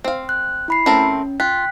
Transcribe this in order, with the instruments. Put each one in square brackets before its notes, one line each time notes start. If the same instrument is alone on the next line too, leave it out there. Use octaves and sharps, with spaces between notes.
[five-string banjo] C4 F5
[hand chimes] F#6
E4 B5 C7
[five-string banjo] A3 C4 A#4 [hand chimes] C#4
[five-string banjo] F4 [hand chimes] G5 F#6 B6